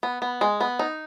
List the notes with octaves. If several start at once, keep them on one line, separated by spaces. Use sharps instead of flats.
B3
B3
G#3
B3
D#4